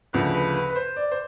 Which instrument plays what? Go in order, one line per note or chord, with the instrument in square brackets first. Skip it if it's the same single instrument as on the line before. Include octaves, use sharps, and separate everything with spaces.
[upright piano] D2 C#3 F3 B4
B4
B4
B4
C5
D5
C5